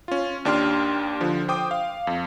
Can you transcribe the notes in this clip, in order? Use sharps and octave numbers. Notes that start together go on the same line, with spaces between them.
C#4 F4
D#2 D4 G4 C6 F6
D3 F3
C5 G5 D6 D#6
F5
F2